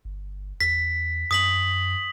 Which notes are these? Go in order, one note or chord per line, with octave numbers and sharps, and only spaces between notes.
G1
E2 B6
F#2 D#6 B6 F#7